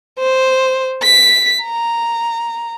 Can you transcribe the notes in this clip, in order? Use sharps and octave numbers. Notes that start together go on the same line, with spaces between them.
C5
B6
A#5